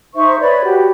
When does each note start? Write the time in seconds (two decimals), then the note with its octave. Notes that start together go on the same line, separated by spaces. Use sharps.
0.15 D#4 C5 E5 C#6
0.40 B4 C#5 D5 B5
0.65 F#4 G4